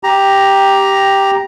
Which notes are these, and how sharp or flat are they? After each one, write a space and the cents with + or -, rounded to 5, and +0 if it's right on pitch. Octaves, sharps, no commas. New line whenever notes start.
G4 +0 A#5 +10